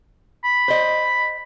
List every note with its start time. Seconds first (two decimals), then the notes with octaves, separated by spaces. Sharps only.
0.44 B5
0.68 C5 D#5